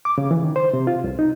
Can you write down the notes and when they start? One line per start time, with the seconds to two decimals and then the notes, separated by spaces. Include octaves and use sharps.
0.05 D6
0.18 C#3
0.31 E3
0.43 D#3
0.56 C5
0.74 C3
0.87 F4
1.04 C2
1.19 D#4